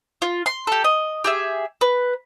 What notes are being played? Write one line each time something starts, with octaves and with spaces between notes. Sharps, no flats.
F4
C6
G4 A4
D#5
G4 G#4 E5
B4